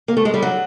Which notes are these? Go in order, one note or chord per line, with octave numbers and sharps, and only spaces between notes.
A#3
A3
G#3
G3
F#3